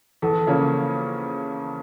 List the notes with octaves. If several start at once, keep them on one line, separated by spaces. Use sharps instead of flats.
E2 A4
C#3 F3 A#3 C#4